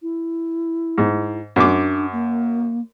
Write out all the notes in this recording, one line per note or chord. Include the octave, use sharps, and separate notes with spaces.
E4
G#2
F#2 D4 D6
A#3